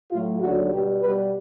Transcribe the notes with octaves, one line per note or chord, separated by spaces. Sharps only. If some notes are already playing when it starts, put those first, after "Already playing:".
A2 F#3 A3 F4
D#2 D3 F#3 F#4
B2 G3 G4
B2 G3 B4